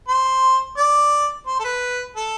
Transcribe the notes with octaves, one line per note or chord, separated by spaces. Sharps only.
C5
D5
C5
A4
B4
A4